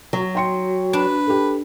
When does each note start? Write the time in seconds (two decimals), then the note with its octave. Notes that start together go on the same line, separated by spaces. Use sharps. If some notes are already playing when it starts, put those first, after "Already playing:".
0.13 F#3
0.35 G5 C6 C#7
0.93 D4 B4
1.27 G4 A4